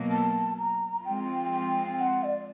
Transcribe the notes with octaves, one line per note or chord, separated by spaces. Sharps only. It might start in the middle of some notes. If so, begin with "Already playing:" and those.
Already playing: B2 F#3 A#3
A5
A#5
F3 G#3 C4 F4 G5
G5
F#5
D5